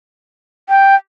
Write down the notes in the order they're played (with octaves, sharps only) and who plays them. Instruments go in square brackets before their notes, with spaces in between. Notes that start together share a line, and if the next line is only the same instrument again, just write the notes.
[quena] G5